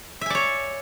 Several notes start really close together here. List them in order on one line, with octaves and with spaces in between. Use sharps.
E5 G#5 D5 C#5